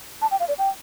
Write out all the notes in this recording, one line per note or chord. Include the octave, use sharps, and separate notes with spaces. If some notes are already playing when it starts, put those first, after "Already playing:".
A5
G5
F5
D5
G5